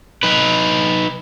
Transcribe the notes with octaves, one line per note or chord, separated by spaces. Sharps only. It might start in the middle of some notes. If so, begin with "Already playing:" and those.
D#4 B4